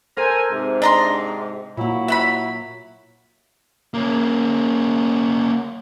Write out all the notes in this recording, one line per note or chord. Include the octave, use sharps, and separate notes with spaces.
A4 A#4 C5 G#5
G#2 C3
D4 D#5 A#5 C6
A#2 F#3 A#3 E4
E5 F#5 B5
A#3 C#4